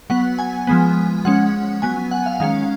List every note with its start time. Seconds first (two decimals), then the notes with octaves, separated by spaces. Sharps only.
0.10 F#3 B3 F#5
0.39 G#5
0.67 F3 G#3 B3
1.25 F3 G#3 C#4 F#5
1.82 F#3 B3 G#5
2.11 F#5
2.26 F5
2.40 D#3 G#3 C#4 F5